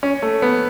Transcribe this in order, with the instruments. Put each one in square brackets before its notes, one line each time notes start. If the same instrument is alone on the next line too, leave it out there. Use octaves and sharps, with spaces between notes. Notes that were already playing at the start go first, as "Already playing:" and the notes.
[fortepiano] C#4
A3
B3